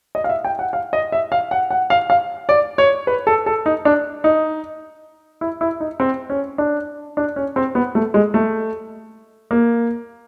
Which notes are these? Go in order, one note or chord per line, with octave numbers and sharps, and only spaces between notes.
D#5
F5
E5
G5
F#5
F5
D#5
E5
F5
F#5
F#5
F5
F5
D5
C#5
B4
A4
A4
D#4
D4
D#4
E4
E4
D#4
C4
C#4
D4
D4
C#4
C4
B3
A3
G#3
A3
A#3